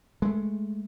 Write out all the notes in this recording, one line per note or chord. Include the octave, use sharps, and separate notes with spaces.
G#3 A3